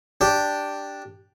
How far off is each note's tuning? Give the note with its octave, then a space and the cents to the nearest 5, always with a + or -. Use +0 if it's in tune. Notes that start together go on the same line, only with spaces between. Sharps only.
D4 +0 G4 +0